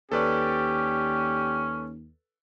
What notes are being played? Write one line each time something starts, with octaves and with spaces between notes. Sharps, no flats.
D#2 C#4 G4 A4 B4 D5